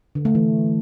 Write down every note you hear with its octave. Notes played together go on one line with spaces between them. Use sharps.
D3
A3
E3